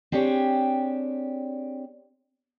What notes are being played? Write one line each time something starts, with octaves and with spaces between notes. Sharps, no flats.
C4 D4 G4 G#4 C#5